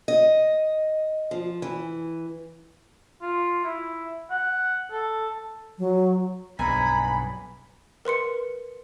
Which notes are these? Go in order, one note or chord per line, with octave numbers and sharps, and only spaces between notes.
D#5
F3
E3
F4
E4
F#5
A4
F#3
B1 G2 G#5 A#5 B5
A#4 B4 C6 C#7